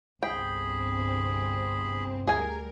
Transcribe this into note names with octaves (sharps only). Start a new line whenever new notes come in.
G1 C2 C4 G#4 G5 B5
D2 G3 G#4 A#4 G#5